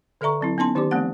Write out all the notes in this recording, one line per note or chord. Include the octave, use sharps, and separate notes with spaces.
D3 A4 D5 E5 A#5 C#6
F#3 C4 E4
B3 C#4 D#4 A5 C6
D#3 D#4 G4 D5 D6
F3 A3 B3 C4 F#5